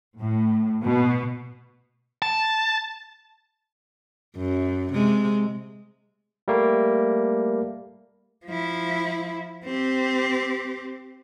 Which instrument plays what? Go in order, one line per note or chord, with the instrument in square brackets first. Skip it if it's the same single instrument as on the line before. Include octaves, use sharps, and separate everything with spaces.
[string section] A2
B2
[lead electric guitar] A5
[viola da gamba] F#2
C3 G#3
[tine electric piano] G3 A3 A#3
[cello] F3 E4
C4 G4